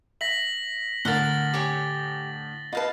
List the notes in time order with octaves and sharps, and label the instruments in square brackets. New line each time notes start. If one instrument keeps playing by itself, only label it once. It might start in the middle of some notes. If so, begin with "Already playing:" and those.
[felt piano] E5 [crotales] A#6 B6 F#7
[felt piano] A2 D3 [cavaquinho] A#4 F5 F#5 [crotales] A6 G7
[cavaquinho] G4 C#5 G#5
[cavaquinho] F4 F5 A5 [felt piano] B4 D#5